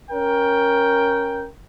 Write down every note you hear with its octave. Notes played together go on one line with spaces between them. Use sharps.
C#4 A#4 G5